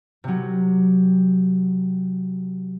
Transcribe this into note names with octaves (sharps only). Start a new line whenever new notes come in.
C3 F#3